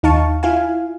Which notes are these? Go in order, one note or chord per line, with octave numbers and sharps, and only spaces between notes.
D#2 D#4 F5 A5 C#6
E4 F4 F5 G#5